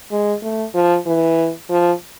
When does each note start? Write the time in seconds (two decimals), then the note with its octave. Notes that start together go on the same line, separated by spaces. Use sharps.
0.11 G#3
0.42 A3
0.74 F3
1.06 E3
1.69 F3